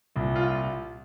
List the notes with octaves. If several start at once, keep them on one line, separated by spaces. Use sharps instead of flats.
C2 A#2
F4
F4